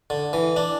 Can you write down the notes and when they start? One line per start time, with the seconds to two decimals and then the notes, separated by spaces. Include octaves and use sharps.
0.10 D3
0.33 E3
0.56 D4